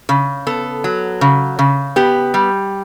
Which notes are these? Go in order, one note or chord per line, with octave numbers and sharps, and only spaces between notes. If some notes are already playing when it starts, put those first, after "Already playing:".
C#3
B3 A4
F#3
C#3
C#3
B3 G4
G3